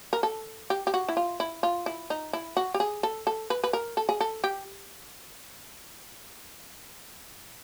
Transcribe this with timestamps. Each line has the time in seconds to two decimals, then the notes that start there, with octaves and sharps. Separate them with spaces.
0.13 A#4
0.23 A4
0.70 G4
0.87 G4
0.94 F#4
1.08 E4
1.17 F4
1.40 E4
1.63 F4
1.86 E4
2.10 D#4
2.33 E4
2.57 F#4
2.74 G4
2.80 G#4
3.03 A4
3.27 A4
3.50 B4
3.64 B4
3.73 A#4
3.97 A4
4.09 G#4
4.20 A4
4.44 G4